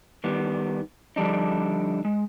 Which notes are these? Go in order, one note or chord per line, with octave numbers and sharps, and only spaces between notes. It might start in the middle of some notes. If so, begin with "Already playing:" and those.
D#3 G3 B3
D3 F3 G3 D4 D#4
G#3